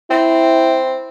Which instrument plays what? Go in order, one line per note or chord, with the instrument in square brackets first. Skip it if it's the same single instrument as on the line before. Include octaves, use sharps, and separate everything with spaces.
[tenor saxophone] C4 [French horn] E4